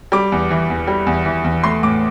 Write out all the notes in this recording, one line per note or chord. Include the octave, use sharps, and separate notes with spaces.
G3 D6
E2
E3
E2
G3
E2
E3
E2
A3 C6
A2 D6